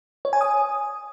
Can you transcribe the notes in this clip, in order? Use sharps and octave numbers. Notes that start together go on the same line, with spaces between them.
C#5
G#5
D#6